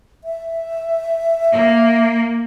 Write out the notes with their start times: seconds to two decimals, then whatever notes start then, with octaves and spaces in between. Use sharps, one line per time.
0.24 E5
1.51 A#3